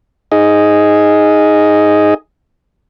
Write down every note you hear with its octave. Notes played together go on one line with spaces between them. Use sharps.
D#4 G#4 D#5